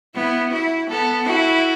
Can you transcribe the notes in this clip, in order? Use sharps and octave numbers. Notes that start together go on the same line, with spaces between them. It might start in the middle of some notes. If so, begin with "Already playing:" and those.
B3 E4
E4 F#4
B3 A4
E4 F#4